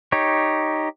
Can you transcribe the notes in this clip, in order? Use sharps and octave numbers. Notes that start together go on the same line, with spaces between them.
D#4 G4 C#5